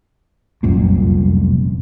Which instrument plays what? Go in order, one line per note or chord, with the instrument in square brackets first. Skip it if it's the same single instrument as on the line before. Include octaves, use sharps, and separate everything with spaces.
[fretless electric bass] F1 C2 F#2 A#2